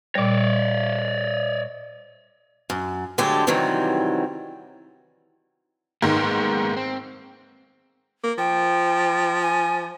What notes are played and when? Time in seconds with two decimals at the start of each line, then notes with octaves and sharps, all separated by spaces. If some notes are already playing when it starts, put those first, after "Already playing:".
0.15 A#2 G3 C#5 D5
2.70 F#2
3.18 D3 F#3 G#3 A3 G4
3.47 C3 D#3 E3 F#3 G3
6.02 G#2 D#3 G#3 A#3 B3
6.77 C4
8.24 A#3
8.38 F3 G5
9.42 G#5